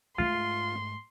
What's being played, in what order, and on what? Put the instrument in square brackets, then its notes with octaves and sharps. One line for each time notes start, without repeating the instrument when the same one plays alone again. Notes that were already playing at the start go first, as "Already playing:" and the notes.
[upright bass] G#2 A3 [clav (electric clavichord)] F4 [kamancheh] C6